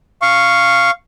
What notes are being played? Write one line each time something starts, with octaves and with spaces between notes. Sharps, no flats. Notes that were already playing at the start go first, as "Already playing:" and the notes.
F5 C#6